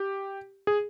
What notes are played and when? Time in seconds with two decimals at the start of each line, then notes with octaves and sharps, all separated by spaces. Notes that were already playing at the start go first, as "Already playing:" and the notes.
Already playing: G4
0.67 G#4